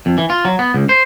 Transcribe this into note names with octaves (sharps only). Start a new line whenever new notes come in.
F2
E3
F4
F#3
B3
C#2
C5